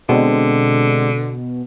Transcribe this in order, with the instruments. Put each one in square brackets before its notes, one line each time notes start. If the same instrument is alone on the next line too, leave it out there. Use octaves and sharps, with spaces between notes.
[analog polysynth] B2 [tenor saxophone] D3 [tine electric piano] G#3 C4 D4